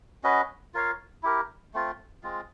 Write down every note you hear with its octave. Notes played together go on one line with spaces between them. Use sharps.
C#4 F#4 B4 D#5
F4 A#4 C#5 F5
E4 G4 A#4
A3 C4 F4
G#3 C4 F4